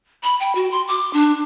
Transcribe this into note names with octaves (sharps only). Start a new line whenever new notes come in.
B5
G5
F#4
C6
D6
D4